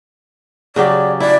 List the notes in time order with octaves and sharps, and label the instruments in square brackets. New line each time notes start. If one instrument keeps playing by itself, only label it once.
[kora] C#3 F#3 G4 [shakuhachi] D5
[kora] E4 [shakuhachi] D5